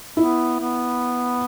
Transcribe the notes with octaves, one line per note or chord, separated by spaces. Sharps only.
B3 E4
B3